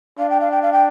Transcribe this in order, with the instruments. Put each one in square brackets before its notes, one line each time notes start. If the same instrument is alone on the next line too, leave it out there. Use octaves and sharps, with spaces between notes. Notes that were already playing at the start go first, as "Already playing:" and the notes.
[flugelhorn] D4 [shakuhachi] F5
[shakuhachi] G5
F5
G5
F5
G5